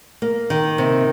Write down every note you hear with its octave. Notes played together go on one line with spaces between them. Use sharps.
A#3
D#3
C3